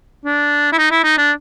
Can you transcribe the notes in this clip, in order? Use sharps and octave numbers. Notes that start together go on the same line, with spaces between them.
D4
E4
D#4
E4
D#4
D4